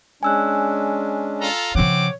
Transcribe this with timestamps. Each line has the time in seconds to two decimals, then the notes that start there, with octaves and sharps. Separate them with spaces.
0.23 G#3 C#4 D4 G#5 E6 F#6
1.41 F4 A4 A#5
1.75 C#3 F3 C4 C#5 F#5 D6